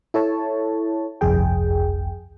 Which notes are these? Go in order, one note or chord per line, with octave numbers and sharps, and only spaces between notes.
E4 A4 C#5 A5
G1 C2 F2 G#4 G5